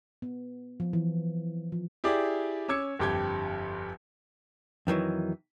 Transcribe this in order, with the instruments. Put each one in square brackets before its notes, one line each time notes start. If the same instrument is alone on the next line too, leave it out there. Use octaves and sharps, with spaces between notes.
[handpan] B3
F3
E3
F3
[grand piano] E4 G4 G#4 D5
C#4 D6 E6 G#6 C#7
G1 F2 G4 G6 G#6
[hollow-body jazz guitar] F2 D#3 E3 F#3